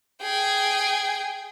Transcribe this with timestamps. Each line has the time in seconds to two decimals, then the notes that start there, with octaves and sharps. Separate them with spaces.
0.22 G#4 G5